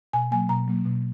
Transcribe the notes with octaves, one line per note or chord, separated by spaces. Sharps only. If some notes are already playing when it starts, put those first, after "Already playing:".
B2 G#5
F#3 A#3 G#5
B2 A#5
F#3 A#3
B2